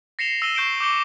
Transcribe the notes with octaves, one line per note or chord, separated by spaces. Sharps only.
A#6 C7 C#7 E7 F7 G7
E6 A#6 D#7 E7 G7
C#6 G6 C7 D7 E7 G7
D6 E6 G6 C#7 G7